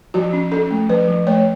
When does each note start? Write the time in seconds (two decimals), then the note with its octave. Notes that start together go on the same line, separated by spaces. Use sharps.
0.14 F3 F#4
0.33 C#4
0.52 C#4 A4
0.71 A3
0.89 F3 B4
1.08 F3
1.27 A3 C#5